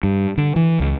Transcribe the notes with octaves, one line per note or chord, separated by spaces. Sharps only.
G2
D3
E3
C#2